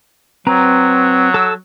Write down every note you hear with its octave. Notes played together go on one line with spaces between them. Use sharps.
F#3 C4 B4 A#5
A4 E6